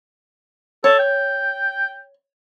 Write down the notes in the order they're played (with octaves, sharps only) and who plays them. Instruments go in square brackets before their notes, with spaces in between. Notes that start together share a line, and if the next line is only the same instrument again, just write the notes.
[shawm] A4 [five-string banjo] C#5
[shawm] G5